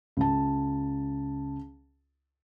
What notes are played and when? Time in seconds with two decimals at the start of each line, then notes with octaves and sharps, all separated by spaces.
0.17 C#2 A5